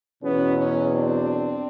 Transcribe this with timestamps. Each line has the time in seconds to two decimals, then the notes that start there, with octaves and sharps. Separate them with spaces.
0.23 E2 B2 F#3 B3 C#4
0.57 B3 C#4
0.92 C4 D4